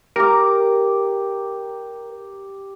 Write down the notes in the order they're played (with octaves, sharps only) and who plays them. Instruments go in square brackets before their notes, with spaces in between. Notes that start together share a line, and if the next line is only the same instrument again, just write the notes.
[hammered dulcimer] G4 A#5 D6 [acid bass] A#4